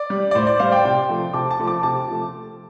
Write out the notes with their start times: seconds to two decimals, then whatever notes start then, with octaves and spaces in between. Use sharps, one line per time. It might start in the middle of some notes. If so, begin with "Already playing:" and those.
Already playing: D5
0.10 G3
0.31 D5
0.35 A2 C5
0.47 D5
0.59 G3 C5 F5
0.72 D5 G5
0.84 C3 G5 C6
1.09 F3 A3
1.33 C3 A5 D6
1.51 A5 D6
1.59 F3 A3
1.67 A5 D6
1.83 C3 A5 D6
2.08 F3 A3